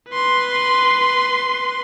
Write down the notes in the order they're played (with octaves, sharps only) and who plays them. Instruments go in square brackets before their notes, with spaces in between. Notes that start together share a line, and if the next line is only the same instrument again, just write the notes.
[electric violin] B4 C6